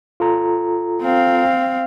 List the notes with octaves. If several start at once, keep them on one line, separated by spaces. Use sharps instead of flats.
F4 A4 A#5
C4 F5